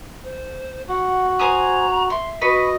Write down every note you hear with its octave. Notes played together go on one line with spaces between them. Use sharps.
C5
F#4 F#5
C5 G#5 A#5 D#6
E5 C6
F#4 B4 D#5 C#6